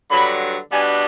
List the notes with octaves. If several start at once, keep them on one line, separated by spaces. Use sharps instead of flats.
G2 D3 F#3 B5
B2 G3 B3 D4 G#5